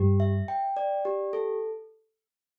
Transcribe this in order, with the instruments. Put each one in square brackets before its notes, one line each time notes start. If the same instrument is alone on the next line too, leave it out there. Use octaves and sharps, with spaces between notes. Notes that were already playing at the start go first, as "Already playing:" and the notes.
Already playing: [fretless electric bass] G2 [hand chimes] G4
[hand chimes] E5
G5
D5
G4
A4